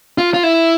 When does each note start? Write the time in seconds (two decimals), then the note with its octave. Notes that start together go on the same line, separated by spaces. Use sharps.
0.18 F4
0.34 F4
0.43 E4